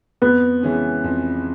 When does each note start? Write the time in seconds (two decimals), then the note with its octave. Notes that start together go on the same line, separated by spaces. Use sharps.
0.22 F2 B3
0.63 C#3 E3 G#3 C#4
1.04 F2